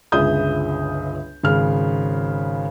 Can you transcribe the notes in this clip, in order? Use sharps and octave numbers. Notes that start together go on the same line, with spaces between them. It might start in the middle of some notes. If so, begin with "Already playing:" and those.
G1 C#2 G#4 E5 D#6 G6
G#1 C#3 F6